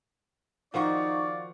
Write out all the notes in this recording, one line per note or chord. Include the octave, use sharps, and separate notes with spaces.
D#3 F3 D#4 F#4 D5 F5 F#5 C#6